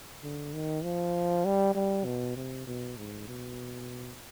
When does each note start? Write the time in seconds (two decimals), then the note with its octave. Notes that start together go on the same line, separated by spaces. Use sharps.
0.23 D3
0.54 D#3
0.84 F3
1.45 G3
1.75 G3
2.05 B2
2.36 C3
2.67 B2
2.97 G#2
3.28 B2